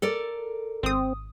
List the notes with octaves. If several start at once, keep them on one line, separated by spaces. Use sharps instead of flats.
A4 A#4 D5
G#1 C4 D#6